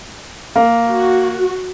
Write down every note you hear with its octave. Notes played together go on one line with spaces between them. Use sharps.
A#3
F#4